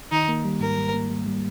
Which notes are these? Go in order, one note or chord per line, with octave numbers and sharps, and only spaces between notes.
D#3 D#4
A#3
G3
G#2 A#4
G3
A#3
G3
G3